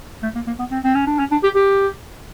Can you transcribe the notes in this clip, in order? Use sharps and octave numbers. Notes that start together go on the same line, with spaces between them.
A3
A#3
A#3
B3
C4
C4
C#4
D4
C#4
D4
G4
G4